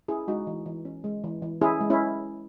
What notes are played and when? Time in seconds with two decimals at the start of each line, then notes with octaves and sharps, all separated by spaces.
0.08 C#4 E4 G#4
0.28 G#3 D#4 F#4
0.47 E3
0.66 E3
0.85 C#4
1.04 G#3
1.24 E3
1.42 E3
1.61 C#4 E4 G#4
1.81 G#3
1.90 C#4 E4